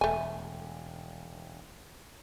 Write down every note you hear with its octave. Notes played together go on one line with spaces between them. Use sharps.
E1 A3 G#5